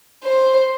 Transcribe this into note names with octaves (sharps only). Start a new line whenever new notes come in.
C5